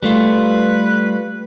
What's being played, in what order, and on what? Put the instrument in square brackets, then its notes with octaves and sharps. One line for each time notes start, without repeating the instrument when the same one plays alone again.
[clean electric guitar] G3 A3 F4 [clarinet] B4